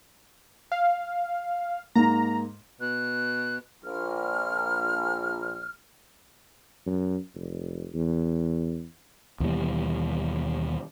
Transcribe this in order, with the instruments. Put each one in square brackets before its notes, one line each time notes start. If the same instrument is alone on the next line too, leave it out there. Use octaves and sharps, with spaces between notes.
[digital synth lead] F5
[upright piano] G#2 A#3 [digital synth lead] A#5
[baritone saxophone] B2 [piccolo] F#6
[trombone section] A#1 [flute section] F6
[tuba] F#2
F1
E2
[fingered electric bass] D#2 B2 E3 G3